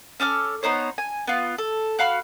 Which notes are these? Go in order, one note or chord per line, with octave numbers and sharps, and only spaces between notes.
C#4 A4 D6 F6
B3 D#4 C5 C#5
G#5
B3 F4
A4
F#4 F5 B5 F6